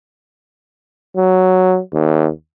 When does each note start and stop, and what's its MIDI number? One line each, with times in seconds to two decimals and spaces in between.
1.17 1.79 54
1.93 2.29 39